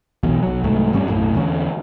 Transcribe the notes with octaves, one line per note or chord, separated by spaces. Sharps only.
B1 E2 B2
B1 F#3
C2 G#2 F#3 A3
G#1 F#2 G3 C#4
B1 F#2 A2
E2 D3 C#4